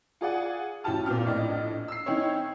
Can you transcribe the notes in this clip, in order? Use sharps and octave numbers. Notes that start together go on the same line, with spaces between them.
F4 G#4 D5 F#5 G#5
A1 E4 F#4 G4 A5 F6
A#2 B3 C4 F6
A#1 A2 D5 D#5
E6 C7
D#3 C4 C#4 D#4 E4 C#5